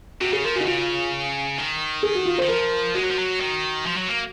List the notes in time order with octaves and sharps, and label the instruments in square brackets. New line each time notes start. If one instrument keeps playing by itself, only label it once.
[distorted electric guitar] C3 [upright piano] F#4
[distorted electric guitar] C#3 [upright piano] G#4
[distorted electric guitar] F3 [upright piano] A#4
[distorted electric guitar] C#3 [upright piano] D#4 F#4
[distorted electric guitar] C#3 [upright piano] F4
[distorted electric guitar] D#3
[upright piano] G#4
F#4
F4
[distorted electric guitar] D#3 [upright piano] C5
[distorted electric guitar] F3 [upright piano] A#4
[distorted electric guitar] G#3 [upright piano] F#4
[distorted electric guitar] F#3
F3
F#3
D#3
F3
F#3
A#3